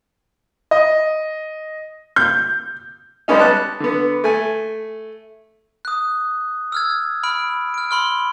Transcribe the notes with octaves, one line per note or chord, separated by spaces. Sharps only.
D#5
G6
G3 G#3 B3 C#4 D#4
A5 F#6
D3 B3
A3 G#5
D#6 F#6
E6 F6 G#6
B5 F6 D7
F6 D7
B5 C6 F6